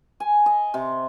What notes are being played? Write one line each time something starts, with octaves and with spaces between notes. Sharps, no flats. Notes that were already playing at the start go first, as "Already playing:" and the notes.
G#5
D#5
C3